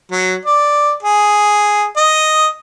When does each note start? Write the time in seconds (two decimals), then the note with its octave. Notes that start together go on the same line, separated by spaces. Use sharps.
0.12 F#3
0.46 D5
1.03 G#4
1.97 D#5